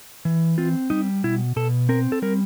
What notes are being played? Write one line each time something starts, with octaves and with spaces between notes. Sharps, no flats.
E3
C4 F4
G3 D#4
B2 E4
B2 A4
C4 A#4
A4
G3 A#4